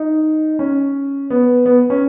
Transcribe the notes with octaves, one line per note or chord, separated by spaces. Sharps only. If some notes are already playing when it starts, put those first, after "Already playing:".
Already playing: D#4
C#4
B3
B3
C#4